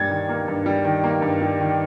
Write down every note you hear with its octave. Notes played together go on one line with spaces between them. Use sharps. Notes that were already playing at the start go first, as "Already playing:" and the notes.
Already playing: G2 G3 A#3 G#6 A6
D#3
A#3
G2
G3
D#3
A#3
G2
G3
D#3